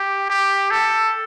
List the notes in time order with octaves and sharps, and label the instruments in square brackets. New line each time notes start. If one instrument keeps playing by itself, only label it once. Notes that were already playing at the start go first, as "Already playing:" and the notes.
Already playing: [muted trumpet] G4
G4
A4